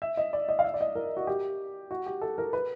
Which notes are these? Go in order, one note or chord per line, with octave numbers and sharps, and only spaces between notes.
E5
D#5
D5
D#5
F5
E5
D5
D#5
A#4
F#4
G4
F#4
G4
A4
A#4
B4